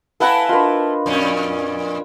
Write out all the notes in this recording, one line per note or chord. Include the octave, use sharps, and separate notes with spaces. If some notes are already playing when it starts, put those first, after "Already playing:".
A3 E4 A4 B4 F5 F#5 G#5 A#5
D4 F4 A#4 B4 D#5
F2 A#2 C#4